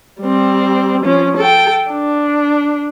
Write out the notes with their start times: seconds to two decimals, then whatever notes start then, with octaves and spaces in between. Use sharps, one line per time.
0.21 G3 C4
1.04 F3 C#4
1.37 A4 G5
1.91 D4